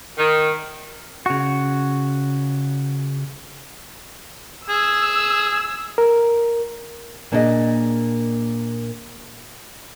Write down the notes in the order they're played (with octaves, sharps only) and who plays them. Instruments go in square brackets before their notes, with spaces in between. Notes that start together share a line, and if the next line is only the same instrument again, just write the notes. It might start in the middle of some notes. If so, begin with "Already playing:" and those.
[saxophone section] D#3
[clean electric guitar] C#3 F#4
[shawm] G#4 [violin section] E6
[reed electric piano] A#4
[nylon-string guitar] A#2 A#3 D4 E4 G#4 D#5